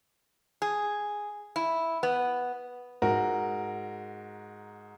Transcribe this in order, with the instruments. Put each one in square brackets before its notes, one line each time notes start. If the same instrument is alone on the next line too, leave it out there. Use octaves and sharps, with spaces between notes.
[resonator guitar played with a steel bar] G#4
E4
B3
[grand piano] G#2 F#4 A#4